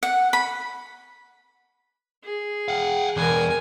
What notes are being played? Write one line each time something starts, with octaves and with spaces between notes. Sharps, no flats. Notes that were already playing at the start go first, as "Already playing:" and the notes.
F#5
B5
G#4
F5 F#5
E2 B2 A#4 G#5